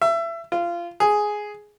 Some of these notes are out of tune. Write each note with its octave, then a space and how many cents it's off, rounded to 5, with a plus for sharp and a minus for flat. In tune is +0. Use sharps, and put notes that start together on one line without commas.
E5 +25
F4 -20
G#4 +5